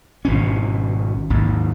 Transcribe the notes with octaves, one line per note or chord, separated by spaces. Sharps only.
G#1 B2 C#4
G#1 D#2